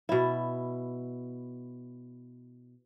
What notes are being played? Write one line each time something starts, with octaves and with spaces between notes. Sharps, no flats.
B2 E4